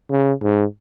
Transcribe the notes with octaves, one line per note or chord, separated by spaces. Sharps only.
C#3
G#2